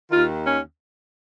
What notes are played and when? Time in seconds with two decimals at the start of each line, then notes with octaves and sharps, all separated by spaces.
0.11 D#2 D#3 F4
0.46 C#4